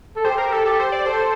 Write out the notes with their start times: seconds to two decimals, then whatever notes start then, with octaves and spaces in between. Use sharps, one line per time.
0.16 A4
0.25 G4 C5
0.38 A#4
0.52 A4
0.66 G4 A4
0.80 C5
0.92 D5
1.06 A4 C5